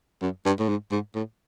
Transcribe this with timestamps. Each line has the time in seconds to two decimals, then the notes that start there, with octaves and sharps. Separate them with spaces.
0.22 F#2
0.45 G2
0.59 A2
0.69 G#2
0.92 G#2
1.15 A2